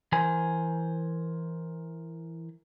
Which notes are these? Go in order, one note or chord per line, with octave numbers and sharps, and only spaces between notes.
E3 A#4 C5 G#5